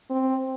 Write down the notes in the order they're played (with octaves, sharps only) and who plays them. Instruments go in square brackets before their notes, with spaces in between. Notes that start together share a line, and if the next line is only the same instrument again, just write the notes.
[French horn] C4